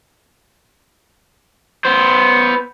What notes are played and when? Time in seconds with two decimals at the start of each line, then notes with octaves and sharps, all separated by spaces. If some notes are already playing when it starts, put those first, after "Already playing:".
1.85 B3 C5